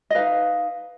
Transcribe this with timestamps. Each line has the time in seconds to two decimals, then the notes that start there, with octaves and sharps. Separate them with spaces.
0.10 D#5
0.15 D#4 B4 F5